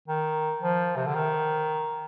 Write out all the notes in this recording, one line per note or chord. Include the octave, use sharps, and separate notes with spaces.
D#3
F3
C3
D3
D#3